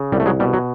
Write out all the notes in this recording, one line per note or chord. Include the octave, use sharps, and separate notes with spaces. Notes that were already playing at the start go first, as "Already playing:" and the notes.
Already playing: C#3
C2 G3
A3
F#3 G#3
B2 G3
F#3